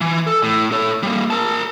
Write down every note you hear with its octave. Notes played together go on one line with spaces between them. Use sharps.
E3
A4
A2
A4 C#5
G3 A#3
A#4 A5